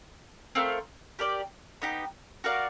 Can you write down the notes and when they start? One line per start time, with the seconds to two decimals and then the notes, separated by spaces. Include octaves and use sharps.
0.55 A3 C4 F4 A#4
1.19 G4 A#4 D5
1.82 B3 D#4 G4
2.44 F#4 A#4 D5 F5